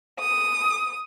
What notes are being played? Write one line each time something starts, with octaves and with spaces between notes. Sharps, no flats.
D#6